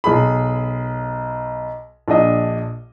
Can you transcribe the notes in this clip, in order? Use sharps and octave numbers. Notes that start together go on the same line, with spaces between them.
B1 G#4 B5
A#1 D4 D#5 D#6